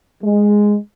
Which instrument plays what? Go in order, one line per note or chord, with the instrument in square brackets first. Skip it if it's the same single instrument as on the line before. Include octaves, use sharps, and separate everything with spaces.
[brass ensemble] G#3